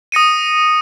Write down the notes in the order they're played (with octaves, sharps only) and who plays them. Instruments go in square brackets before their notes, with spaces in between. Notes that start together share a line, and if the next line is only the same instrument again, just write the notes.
[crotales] D#6 A#6 C#7 D#7